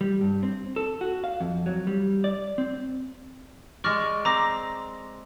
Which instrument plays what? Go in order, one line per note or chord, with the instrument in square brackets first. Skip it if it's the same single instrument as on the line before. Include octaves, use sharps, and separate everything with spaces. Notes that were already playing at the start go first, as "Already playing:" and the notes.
[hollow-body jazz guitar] G3
G2
C4
A4
F#4
F5
F2
F#3
G3
D5
C4
[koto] G#3 D5 [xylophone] C#6 F6 A#6
[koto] C4 [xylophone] A#5 D6 A#6